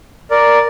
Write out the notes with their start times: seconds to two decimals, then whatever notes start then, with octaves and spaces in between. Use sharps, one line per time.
0.31 A#4 D5